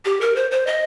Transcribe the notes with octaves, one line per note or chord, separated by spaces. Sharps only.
G4
A#4
C5
C5
D#5